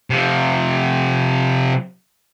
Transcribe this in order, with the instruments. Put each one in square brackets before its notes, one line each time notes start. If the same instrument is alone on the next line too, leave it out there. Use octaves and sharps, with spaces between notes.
[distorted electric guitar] C3 F3